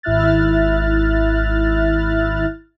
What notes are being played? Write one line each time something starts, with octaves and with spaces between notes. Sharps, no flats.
G#1 E4 E5 F6 F#6 A6